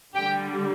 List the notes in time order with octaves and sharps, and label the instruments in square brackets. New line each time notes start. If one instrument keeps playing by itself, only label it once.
[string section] D3 G3 G4 G5